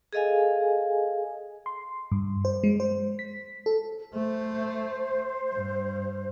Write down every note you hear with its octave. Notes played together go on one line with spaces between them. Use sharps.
G#4 A4 D#5 F5 G#5
C6
G2
C5
G#3
C5
B6
A4
A3 C5
G2